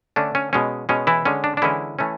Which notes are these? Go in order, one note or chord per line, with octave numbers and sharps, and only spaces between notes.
D3 A3 C#4 D4
C#4
B2 G#3 C#4
B2 G#3 C#4
E3 E4
D3 G#3 C#4
D4
D4
D3 E3 G#3 C#4 E4
E3 A3 C#4